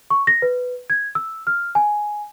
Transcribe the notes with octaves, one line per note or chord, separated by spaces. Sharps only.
C#6
A#6
B4
G#6
E6
F6
G#5